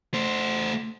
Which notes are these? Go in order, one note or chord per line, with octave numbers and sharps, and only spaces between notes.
A3 C5